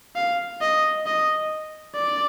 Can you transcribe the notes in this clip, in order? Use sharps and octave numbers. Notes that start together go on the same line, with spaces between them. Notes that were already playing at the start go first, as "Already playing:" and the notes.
F5
D#5
D#5
D5